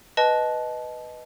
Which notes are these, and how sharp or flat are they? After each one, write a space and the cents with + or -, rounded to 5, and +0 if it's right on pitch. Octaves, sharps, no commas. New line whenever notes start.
B4 +0 D#5 +0 A5 -20